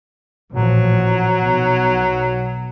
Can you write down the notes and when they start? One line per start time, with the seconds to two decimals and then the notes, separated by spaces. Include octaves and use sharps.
0.52 A1 A#2 F3 F#3
1.39 B1